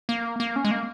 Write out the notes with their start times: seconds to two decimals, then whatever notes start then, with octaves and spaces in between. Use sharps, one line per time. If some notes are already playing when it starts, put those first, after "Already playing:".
0.09 A#3
0.40 A#3
0.56 C#4
0.65 G#3
0.71 A#3